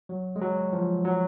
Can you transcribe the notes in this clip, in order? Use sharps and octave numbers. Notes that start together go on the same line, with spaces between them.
F#3
G#3
F#3
F3
F#3